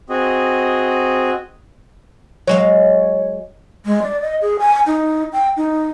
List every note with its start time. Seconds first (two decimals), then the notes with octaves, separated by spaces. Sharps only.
0.10 C4 F#4 G#4 D#5
2.47 F#3 G#3 C#5 F5
3.86 G#3
4.02 D5
4.21 D#5
4.42 G#4
4.59 G#5
4.87 D#4
5.33 G5
5.57 D#4